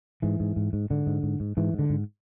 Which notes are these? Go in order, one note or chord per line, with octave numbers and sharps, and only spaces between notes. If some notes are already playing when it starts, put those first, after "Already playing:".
G#2 E3
G#2
G#2
G#2
G#2 D3
G#2
G#2
G#2
G#2 E3
G#2
D3
G#2